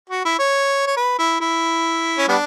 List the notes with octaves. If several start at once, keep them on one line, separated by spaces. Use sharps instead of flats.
F#4
E4
C#5
C#5
B4
E4
E4
C#4
G3 B3 D4